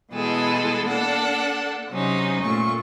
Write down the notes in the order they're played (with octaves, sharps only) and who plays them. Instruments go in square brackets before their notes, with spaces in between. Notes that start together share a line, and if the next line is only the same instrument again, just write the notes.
[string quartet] B2 E3 G#3 E4 G#4 A4
A#3 D4 A4 F#5
C3 F#3 C#4 D#4
A#2 A3 C#6